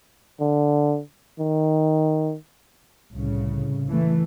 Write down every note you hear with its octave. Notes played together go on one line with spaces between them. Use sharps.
D3
D#3
C2 A2 C#3
E3 A3